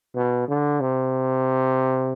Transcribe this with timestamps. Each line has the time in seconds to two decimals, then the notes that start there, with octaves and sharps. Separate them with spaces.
0.15 B2
0.48 D3
0.80 C3